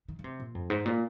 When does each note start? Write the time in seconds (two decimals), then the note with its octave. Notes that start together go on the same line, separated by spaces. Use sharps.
0.08 D#3
0.19 D#3
0.24 C3
0.40 A#2
0.55 F2
0.70 G#2
0.86 A#2